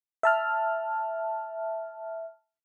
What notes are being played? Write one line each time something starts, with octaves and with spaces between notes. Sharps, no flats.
E5 A5 F6